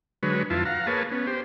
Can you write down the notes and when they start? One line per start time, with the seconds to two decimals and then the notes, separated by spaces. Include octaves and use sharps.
0.23 D3 F#3 G#3 B4 C#5
0.50 F2 E4 F4 A5
0.65 F5 F#5 A#5
0.87 A#3 G#4 B4 C#5 A5
1.12 B3 C#4
1.27 G4 C5